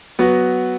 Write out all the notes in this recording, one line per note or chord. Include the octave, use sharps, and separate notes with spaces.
F#3 B3 F#4